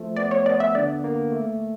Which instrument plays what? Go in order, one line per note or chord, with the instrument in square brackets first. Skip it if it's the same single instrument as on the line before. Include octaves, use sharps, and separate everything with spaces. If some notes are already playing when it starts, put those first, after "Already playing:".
Already playing: [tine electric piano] F3 A3
[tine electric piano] B3 [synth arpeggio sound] D5
[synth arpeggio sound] C#5
[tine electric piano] B3 [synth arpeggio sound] D5
[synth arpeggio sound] E5
[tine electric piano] D3 [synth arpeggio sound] D5
[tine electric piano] A#3
A3